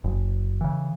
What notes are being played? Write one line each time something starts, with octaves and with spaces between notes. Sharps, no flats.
F#1
C#3 E3